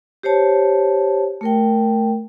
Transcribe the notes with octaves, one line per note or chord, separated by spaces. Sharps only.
G4 C5 C#5 A5
A3 A#4 G5